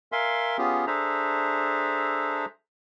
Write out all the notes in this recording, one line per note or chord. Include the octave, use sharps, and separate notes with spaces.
A#4 E5 F5 G#5 C6
B3 C#4 F4 G4 G#4
D4 G#4 A4 C5 E5 A#5